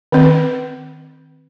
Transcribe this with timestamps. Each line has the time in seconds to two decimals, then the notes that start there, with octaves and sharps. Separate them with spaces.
0.12 D#3 C4